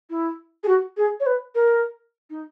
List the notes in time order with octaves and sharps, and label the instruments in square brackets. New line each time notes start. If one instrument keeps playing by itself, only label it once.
[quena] E4
G#4
F#4
G#4
C#5
B4
A#4
D#4